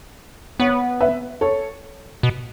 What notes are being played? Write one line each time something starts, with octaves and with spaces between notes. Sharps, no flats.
B3 C#5 F#5
B4 E5
A4 C#5
B2